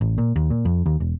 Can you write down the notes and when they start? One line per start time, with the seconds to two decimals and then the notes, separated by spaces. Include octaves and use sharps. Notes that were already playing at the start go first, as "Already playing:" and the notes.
0.01 A1
0.18 A#2
0.36 D#2
0.50 A#2
0.65 F2
0.86 D#2
1.00 E1